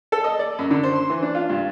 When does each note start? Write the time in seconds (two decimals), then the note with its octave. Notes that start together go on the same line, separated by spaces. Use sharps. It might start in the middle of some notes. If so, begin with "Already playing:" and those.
0.12 A4
0.24 D#5
0.39 D5
0.59 F#2
0.70 D3
0.83 C5
0.95 C6
1.09 E3
1.22 D4
1.35 F4
1.50 G2